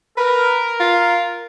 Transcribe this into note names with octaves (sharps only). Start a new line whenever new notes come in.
A#4 B4
F4